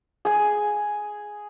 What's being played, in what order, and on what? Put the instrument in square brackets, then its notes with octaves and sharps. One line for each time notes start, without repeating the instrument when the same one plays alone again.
[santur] G#4 G#5